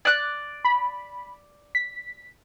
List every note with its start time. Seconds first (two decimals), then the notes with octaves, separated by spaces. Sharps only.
0.05 D5 F#6
0.65 B5
1.75 B6